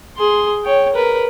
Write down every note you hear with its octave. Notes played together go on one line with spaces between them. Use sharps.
G#4 C6
C#5 G5
A#4 B4